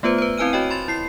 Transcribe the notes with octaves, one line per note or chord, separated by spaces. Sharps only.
A3 B3 F4 B4 C5
B4 C5
C4 E4 B4 G#5 F6 D#7
F#4 C#5 D#5 G5
B5 C6 A6
E4 C7